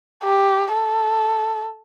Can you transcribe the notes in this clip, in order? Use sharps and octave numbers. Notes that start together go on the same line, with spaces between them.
G4
A4